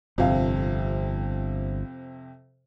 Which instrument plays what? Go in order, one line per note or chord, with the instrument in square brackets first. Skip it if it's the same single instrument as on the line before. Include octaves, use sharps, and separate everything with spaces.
[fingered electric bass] G1 [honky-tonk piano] F2 C3 F5